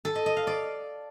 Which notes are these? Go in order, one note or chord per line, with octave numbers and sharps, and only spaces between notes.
A4
D#5
D#5
F5
D5